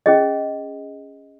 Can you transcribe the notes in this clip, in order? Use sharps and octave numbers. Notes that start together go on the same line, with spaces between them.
C#4 G#4 D#5